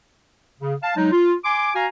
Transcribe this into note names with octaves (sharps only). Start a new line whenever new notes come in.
C#3
F5 A5
F#3 G#3 D#4
F4
G#5 C6 D6
F#4 F5 G#5 A#5